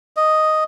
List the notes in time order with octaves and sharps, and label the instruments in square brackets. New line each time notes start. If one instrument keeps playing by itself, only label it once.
[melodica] D#5